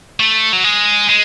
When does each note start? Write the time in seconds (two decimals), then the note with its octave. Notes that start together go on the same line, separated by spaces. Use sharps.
0.20 A3
0.53 F#3
0.64 G#3
1.09 G#3